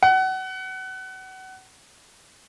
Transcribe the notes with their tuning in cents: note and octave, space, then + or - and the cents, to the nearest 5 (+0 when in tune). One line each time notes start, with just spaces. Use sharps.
F#5 +30